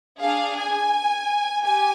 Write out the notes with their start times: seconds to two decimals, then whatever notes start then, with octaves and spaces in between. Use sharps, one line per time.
0.21 D4 G#4 F5
0.57 G#5
1.64 G4 G#5